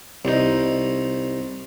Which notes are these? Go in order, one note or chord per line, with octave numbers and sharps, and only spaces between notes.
C2 D#4